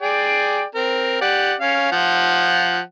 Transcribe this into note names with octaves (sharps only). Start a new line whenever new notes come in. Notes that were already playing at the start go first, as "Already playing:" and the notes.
G#4 D5 G5
C4 A#4
G4 D5 F#5
C#4 F5
F3 F4 F#5